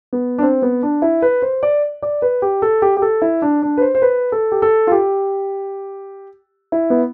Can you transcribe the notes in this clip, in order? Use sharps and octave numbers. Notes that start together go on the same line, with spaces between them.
B3
D4
C4
B3
D4
E4
B4
C5
D5
D5
B4
G4
A4
G4
G4
A4
E4
D4
D4
B4
C5
C5
B4
A4
G4
A4
F4
G4
E4
B3